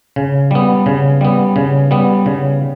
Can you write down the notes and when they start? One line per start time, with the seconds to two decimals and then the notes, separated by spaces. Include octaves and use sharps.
0.16 C#3
0.51 G3 B3
0.86 C#3
1.21 G3 B3
1.56 C#3
1.91 G3 B3
2.26 C#3